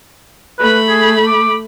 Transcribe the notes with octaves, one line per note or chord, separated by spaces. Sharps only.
A3 B4 B5
G#4
D6